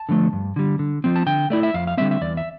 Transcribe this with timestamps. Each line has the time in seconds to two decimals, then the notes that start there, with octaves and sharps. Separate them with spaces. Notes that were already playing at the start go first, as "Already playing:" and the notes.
Already playing: A5
0.09 D3 F3 A3
0.33 G2
0.56 D3 G3
0.79 D3
1.04 F3 C4
1.16 A5
1.26 D3 G5
1.50 A3 E4 D5
1.63 E5
1.74 F2 F5
1.87 F5
1.98 D3 G3 C4 E5
2.11 E5
2.21 E2 D5
2.37 E5